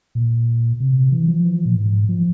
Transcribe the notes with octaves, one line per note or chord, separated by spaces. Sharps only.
A#2
C3
E3
F3
E3
F3
A#2
G#2
F3